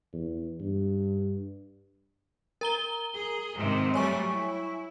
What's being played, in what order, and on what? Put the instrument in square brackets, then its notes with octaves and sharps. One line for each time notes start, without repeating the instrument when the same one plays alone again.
[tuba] E2
G2
[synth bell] A#4 A#5 G7
[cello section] G#4
G#2 C3 D#3
[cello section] F#3 G3 A3 [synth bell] C#5 G#5 C#6
[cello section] E4